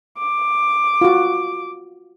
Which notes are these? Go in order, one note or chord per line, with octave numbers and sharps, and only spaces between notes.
D6
F4 F#4